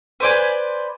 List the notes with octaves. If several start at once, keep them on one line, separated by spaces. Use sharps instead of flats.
B4 C5 D5 G#5